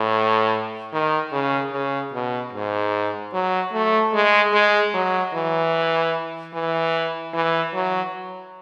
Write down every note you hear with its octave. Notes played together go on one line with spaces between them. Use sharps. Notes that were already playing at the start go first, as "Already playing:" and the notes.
Already playing: A2
D#3
C#3
C#3
B2
G#2
F#3
A3
G#3
G#3
F#3
E3
E3
E3
F#3